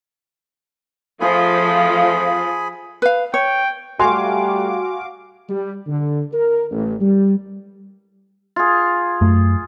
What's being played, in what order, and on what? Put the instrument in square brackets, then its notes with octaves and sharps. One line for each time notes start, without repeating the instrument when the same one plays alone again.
[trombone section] F2 A3 F4 [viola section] F3 [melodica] G#4 G#5 B5
[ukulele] B4 F5
[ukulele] C#5 [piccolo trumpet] G5
[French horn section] G3 A3 [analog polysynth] F#4 F5 D6 [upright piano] G#5 C6
[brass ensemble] G3
D3
A#4
A1
G3
[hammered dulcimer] F4 G#4
[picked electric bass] F#2 A3